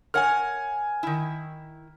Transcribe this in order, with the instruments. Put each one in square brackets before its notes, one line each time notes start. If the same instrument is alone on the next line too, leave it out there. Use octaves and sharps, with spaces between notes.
[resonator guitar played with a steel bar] A#4 C#5 F#5 [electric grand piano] G#5 F6
[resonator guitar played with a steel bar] D#3 E4